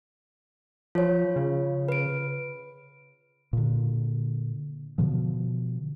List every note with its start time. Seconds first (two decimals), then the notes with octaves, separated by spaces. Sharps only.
0.95 F3 F4 C#5
1.36 C#3
1.89 B4 D7
3.53 A#2 D3
4.98 B2 D3 F3